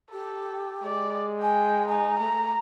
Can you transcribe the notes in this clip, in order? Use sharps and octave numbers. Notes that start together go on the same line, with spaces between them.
G4 A4
G#3 D5
G5 G#5
D#4 G#5
A3 A#5